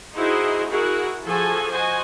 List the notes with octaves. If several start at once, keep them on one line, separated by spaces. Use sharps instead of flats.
D#4 E4 F#4 G#4 C5 D#5
E4 F#4 G#4 A#4 F#5
F3 F#4 G#4 A4 G#5
F#4 C5 D#5 G#5